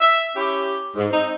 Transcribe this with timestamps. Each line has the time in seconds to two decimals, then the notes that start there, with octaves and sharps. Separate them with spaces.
0.01 E5
0.36 C#4 E4 G4
0.96 G#2
1.10 C4 D#4